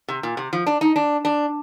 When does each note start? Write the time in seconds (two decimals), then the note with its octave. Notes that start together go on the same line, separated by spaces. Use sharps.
0.08 C3
0.23 A#2
0.37 C3
0.53 F3
0.67 D4
0.81 D#4
0.96 D4
1.25 D4